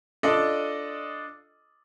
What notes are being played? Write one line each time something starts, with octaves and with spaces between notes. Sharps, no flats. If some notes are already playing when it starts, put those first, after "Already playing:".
D4 F4 A4 D5 D#5